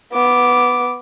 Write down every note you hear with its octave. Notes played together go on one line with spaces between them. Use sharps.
B3 D6